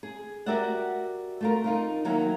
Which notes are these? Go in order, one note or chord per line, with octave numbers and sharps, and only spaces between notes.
G#4
F#4 G4 A#4 D5 E5 F#5
A3 F4 A#4
D#4 F4 A#4
D#3 F#3 A#3 E4